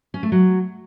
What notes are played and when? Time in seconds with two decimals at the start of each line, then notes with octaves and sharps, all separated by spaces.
0.14 C#4
0.23 A3
0.32 F#3